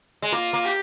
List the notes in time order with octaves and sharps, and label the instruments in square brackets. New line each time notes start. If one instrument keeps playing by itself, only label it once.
[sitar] G#3
[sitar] A#3 [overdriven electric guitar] F4
[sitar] A#3
[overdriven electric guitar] G4